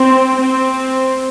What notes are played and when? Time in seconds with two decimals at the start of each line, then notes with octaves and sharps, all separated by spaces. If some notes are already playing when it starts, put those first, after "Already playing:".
Already playing: C4
0.37 C4